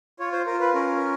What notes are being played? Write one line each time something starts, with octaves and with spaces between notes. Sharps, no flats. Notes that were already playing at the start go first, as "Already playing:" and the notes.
F4 C#5
C5
F4 A#4
B4
C#4 A#4